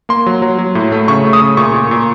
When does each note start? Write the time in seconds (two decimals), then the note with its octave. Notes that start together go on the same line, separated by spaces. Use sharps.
0.09 A#3 C6
0.26 F#3
0.42 F#3
0.58 F#3
0.75 A2
0.92 A3
1.08 C#3 C#6
1.25 A3
1.33 D#6
1.42 C#3
1.57 A#2 C#6
1.73 A#2
1.91 A#2